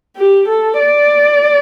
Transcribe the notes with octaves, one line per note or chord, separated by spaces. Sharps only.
G4
A4
D5